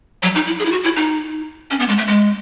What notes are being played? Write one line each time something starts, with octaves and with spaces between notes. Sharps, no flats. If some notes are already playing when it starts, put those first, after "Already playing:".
F#3
D#4
E4
G#4
E4
F#4
E4
D#4
C#4
B3
G#3
A3
G#3